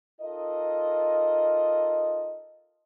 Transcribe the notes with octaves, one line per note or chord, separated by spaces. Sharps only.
D#4 F4 A4 A#4 D#5